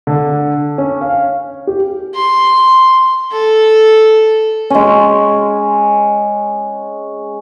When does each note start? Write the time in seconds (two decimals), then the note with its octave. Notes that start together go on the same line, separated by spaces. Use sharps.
0.07 D3
0.78 C#4
1.01 F5
1.67 G4
2.16 C6
3.32 A4
4.70 G#3 C#4